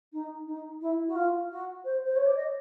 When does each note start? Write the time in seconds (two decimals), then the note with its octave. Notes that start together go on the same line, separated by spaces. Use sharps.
0.13 D#4
0.47 D#4
0.81 E4
1.08 F#4
1.16 F4
1.51 F#4
1.85 C5
2.05 C5
2.16 C#5
2.26 D5
2.36 D#5